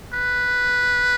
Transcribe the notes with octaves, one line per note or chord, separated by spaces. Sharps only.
B4